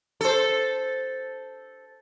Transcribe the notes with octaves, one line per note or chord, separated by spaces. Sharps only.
A4 C5